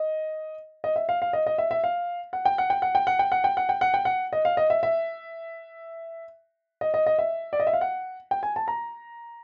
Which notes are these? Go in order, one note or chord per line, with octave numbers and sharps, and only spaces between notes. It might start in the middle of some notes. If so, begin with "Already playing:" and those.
Already playing: D#5
D#5
E5
F5
F5
D#5
D#5
E5
E5
F5
F#5
G5
F#5
G5
F#5
G5
F#5
G5
F#5
G5
F#5
G5
F#5
G5
F#5
D#5
F5
D#5
E5
E5
D#5
D#5
D#5
E5
D5
D#5
E5
F5
F#5
G5
G#5
A5
A#5